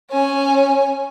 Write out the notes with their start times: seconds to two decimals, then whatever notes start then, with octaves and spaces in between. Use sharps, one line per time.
0.10 C#4 G#5